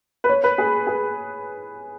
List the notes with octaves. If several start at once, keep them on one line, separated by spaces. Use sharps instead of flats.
B4
C#5
B4
G#4
G#4